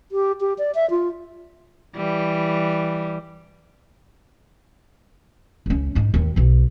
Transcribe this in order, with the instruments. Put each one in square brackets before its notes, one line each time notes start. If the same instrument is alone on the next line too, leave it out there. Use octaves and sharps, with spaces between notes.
[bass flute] G4
G4
D5
E5
F4
[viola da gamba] E3 G3
[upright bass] C#2 C#4
G#2 D#4
D#2 E3
B1 B2